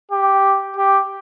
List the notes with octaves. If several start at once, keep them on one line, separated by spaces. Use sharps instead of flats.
G4
G4